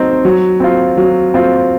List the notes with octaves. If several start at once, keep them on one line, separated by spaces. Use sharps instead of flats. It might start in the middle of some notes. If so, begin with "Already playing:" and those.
Already playing: F#3 C4 D#4
F#3
C4 F4
F#3
C4 F4